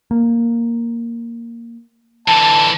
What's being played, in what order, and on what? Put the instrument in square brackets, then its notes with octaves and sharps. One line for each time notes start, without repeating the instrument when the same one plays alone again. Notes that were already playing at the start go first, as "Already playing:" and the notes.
[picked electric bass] A#3
[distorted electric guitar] D3 E3 [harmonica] A5